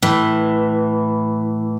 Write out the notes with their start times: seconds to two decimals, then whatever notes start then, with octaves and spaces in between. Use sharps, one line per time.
0.02 A2 E3